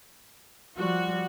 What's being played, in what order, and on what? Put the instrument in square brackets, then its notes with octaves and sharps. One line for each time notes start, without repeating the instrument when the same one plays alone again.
[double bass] F3 G3 [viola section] F#4